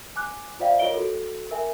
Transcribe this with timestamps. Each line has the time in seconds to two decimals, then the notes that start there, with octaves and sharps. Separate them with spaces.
0.16 G#5 D6 F#6
0.60 F4 C5 D5 E5 F5 G5
0.79 F4 A#4 C#5 D#5 D7 G7
0.94 F#4 A4
1.51 A#4 E5 G5 G#5